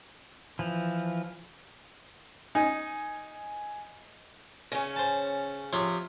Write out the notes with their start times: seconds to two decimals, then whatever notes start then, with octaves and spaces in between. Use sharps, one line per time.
0.59 E3 F3
2.55 D#4 G#5
4.72 C#3 C#4
4.96 C5 A5
5.73 C3 F3 C#5